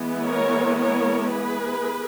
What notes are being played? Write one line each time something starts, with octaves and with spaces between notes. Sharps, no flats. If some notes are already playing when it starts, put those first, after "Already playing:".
Already playing: E3 G#3 B3
A#4 C#5
A#4 C#5
G#4 B4